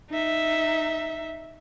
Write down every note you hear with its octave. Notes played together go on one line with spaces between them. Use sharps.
D#4 E5